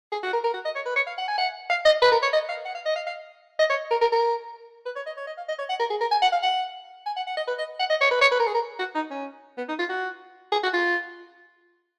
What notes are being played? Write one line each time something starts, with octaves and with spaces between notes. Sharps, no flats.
G#4
F#4
A#4
A#4
F#4
D#5
C#5
B4
C#5
F5
F#5
G#5
F#5
F5
D#5
B4
A#4
C#5
D#5
F5
F#5
F5
D#5
F5
F5
D#5
C#5
A#4
A#4
A#4
B4
C#5
D#5
C#5
D#5
F5
D#5
C#5
F#5
A#4
G#4
A#4
G#5
F#5
F5
F#5
G#5
F#5
F#5
D#5
B4
D#5
F#5
D#5
C#5
B4
C#5
B4
A#4
G#4
A#4
F#4
D#4
C#4
B3
D#4
F4
F#4
G#4
F#4
F4